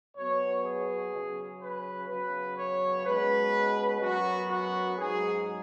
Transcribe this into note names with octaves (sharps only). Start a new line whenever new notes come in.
B2 F#3 B3 C#5
G#4
C#3 F#3 C#4
B4
C#3 F#3 B3 B4
C#5
B2 G#3 C#4 B4
F#2 F#3 B3 F#4
F#4
G#2 F#3 C#4 G#4